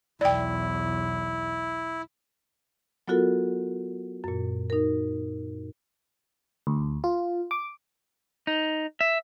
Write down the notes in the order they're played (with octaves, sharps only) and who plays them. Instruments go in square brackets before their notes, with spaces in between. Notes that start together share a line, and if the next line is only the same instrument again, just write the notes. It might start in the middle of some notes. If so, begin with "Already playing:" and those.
[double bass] B1 E2 [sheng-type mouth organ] E4 [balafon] D5 G5
[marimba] F#3 B3 F4 F#4 A4 A#4
F#2 A#2
D#4 A#4
[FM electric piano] D2
F4
D6
[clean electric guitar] D#4
E5